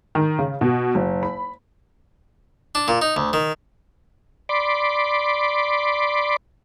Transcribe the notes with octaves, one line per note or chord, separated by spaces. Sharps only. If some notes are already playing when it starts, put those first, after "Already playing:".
D#3
C#3
B2
F#1
B5
D4
A#2
D#4
D2
D#3
D5 B5 C6 D6